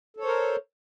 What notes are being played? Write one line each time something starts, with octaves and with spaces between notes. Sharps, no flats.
A4 A#4 C5 C#5